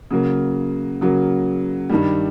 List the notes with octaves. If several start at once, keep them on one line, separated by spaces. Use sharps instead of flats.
C#3 F#3 A#3
C#3 F#3 A#3
G2 D#3 G3